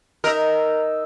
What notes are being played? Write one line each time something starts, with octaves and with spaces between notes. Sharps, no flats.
D#4 A#4 E5